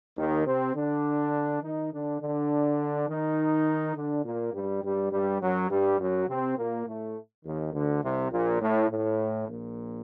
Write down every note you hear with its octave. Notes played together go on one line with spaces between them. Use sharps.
D#2 D#3
C3 C4
D3 D4
D#3 D#4
D3 D4
D3 D4
D#3 D#4
D3 D4
A#2 A#3
G2 G3
G2 G3
G2 G3
F#2 F#3
G2 G3
F#2 F#3
C3 C4
A#2 A#3
A2 A3
D#2 D#3
D2 D3
C2 C3
A#1 A#2
A2
A2
A#1 A#2